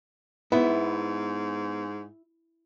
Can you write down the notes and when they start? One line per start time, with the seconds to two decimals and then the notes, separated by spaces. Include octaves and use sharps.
0.52 G#2 B3 E4